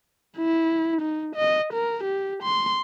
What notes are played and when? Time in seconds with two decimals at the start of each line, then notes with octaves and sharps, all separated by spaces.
0.37 E4
1.01 D#4
1.36 D#5
1.73 A#4
2.04 G4
2.43 C6